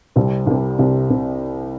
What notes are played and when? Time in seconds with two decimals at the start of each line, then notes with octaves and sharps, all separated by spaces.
0.16 C2 C3 G3 C4
0.47 C2 C3 G3 C4
0.79 C2 C3 G3 C4
1.10 C3 G3 C4